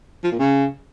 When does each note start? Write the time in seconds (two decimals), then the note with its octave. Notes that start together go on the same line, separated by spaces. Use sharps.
0.24 F3
0.31 A#2
0.39 C#3